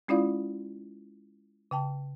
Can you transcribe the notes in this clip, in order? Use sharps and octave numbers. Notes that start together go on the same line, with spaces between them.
G#3 C#4 E4 F4 D5 F5
C#3 G5 A5